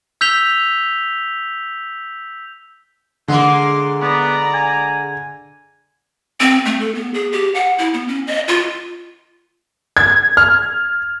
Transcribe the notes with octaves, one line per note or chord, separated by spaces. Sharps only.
E6 G6 B6 F7 G7
D3 G#3 A#3 C6 D6
B3 D5 A#5
G#5
C4
A3
A4
B3
G#4
G4
F#5
E4
B3
C#4
D#5
F4
G#6
F6